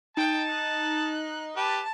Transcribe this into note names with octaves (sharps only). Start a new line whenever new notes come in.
D#4 G5 A5
F#6
G4 B4 A5